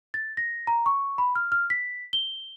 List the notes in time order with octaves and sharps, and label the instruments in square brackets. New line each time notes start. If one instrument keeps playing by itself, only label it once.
[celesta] A6
A#6
A#5
C#6
B5
F6
F6
B6
G7